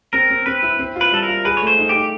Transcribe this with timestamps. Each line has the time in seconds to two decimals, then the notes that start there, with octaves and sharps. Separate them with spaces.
0.13 C4 A#4
0.30 C4
0.46 C4 B4
0.62 E4
0.79 C4
0.96 F4
1.01 B4
1.11 G3 A4
1.23 A#4
1.28 F4
1.45 G#4 B4
1.57 C#5
1.62 A3
1.67 C5
1.78 D#4
1.89 D#4 G4